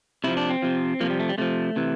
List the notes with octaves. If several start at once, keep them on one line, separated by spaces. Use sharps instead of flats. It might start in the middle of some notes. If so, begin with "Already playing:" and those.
C3 F3 E4
D4
C4
C3 F3
C3 F3 A#3
G3
A3
G3
C3 F3 A3
C3 E3